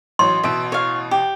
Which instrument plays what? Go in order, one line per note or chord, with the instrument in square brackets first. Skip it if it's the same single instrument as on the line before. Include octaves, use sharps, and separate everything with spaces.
[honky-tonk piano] A1 F#3 [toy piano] C6
[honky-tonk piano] A1 B2 D7 [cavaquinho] E5
[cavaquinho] C#5 F5
G4